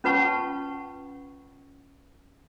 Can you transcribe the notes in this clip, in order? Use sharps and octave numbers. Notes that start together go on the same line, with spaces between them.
C#4 F4 B4 F#5 A5 C#6